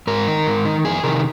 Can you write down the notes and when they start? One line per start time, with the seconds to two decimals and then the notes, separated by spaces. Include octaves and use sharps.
0.07 G#2 A#4
0.28 D#3
0.47 G#2
0.65 D#3
0.85 F2 G#4
1.03 C3 D#3 A#4